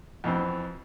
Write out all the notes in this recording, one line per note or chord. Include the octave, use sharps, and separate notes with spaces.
F2 B2 E3 C4